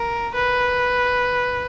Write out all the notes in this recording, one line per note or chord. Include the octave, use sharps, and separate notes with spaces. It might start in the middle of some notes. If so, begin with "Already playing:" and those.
Already playing: A#4
B4